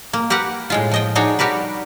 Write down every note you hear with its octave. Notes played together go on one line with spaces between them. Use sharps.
A#3
G4 A#4 B4 F#5
A2 G#3 F4
F3 D#5 G5
D4 D#4 F#4 G#4 C#5
G3 F#4 G4 A#4 B4